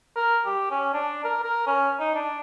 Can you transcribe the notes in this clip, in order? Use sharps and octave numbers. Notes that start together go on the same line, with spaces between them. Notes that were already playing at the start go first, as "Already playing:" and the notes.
A#4
G4
C#4
D4
A#4
A#4
C#4
D#4
D4